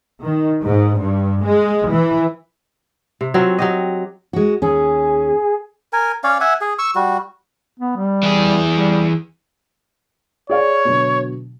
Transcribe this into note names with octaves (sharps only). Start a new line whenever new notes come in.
D#3
G#2
G2
G#3
E3
C3
F#3 C4 F4 F#4
F#3 G4 D#5
G#3 F#4
D#2 C#4 G#4
A#4 G#5
C#4 C#5 D5 F5
E5 F#5 G#5
G#4
C#6 E6
G3 F#4
B3
G3
E3 G#4
G3
G#4 C#5 D5 F5
B2 D3 F#3